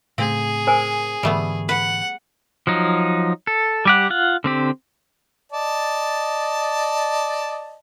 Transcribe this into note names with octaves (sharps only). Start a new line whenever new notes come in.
A2 C#3 A3 C4 G#4 F5
A#4 C5 G#5
G#2 D3 E3 G3 A3 B3
B4 F#5
F3 F#3 D#4
A4
G3 G4 F#5
F4 F#5
D3 C4 G4
D5 D#5 A5